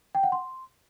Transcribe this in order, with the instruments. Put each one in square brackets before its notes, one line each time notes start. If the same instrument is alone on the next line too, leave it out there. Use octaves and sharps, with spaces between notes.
[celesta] G5
F#5
C6